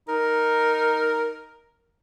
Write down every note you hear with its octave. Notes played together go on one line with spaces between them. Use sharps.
D#4 A#4